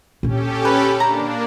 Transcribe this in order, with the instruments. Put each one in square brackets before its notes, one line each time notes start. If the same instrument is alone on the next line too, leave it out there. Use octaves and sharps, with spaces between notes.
[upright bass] A#2 D3 [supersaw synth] C#4 G4 A4
[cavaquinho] B4
[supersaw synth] A#3 D4 [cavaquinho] A#5